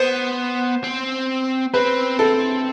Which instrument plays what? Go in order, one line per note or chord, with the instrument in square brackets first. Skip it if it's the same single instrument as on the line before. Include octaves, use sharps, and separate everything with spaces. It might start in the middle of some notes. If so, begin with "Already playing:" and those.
Already playing: [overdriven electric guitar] B3 [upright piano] C5
[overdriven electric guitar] C4
[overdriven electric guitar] C4 [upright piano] B4
[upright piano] A4